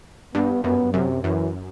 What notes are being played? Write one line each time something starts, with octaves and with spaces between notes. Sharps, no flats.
G2 B3
F#2 B3
F#2 C3
F#2 E3